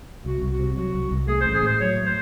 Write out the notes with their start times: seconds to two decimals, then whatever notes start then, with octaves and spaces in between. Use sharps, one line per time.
0.24 C2 F#4
0.42 C2
0.50 F#4
0.59 C3
0.76 F#3 F#4
0.94 C2
1.11 C2
1.27 A3 G#4
1.41 C5
1.45 A1
1.54 G#4
1.63 A2 C5
1.80 F#3 C#5
1.97 A3
2.05 C5